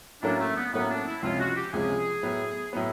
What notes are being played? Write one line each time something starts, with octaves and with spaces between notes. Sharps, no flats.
A2 F#3 A#3 C#4 D4
A3
B3
A2 F#3 A#3 B3 C#4
D4
E4
C#2 C3 F3 G#3 C#4 F4
F#4
G4
C#2 C3 F3 G#3 C#4 G#4
A2 F#3 B3
A2 F#3 B3